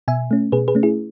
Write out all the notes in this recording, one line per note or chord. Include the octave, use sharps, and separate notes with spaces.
B2 E5 G#5
A3 C#4
B2 G#4 B4
G#4 B4
A3 C#4
E4 G#4